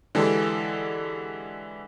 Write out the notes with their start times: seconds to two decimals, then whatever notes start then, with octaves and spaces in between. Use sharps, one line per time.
0.15 D3 E3 G#3 G4 A4